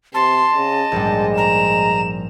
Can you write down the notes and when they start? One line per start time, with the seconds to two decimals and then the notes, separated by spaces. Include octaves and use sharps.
0.14 C3 A5 C6
0.55 C#3 D#5
0.92 A#1 G#2 G3 G#3
1.37 A#5 E7